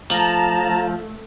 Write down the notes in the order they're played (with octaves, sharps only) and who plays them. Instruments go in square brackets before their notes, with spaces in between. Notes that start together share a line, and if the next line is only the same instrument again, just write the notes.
[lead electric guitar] F3 [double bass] A3 [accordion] A5 A#5